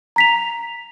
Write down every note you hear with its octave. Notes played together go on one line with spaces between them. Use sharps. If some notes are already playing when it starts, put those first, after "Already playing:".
A#5 B6 F7